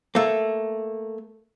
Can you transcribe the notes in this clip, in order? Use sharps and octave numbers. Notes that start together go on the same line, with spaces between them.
A3 A#3